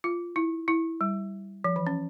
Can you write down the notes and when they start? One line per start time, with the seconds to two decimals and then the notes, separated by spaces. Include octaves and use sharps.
0.04 F4
0.36 E4
0.68 E4
1.01 G3
1.64 F3
1.76 E3
1.87 C#4